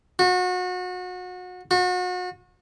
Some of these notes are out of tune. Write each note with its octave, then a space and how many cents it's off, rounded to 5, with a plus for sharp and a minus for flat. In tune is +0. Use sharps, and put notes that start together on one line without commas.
F#4 -30
F#4 -35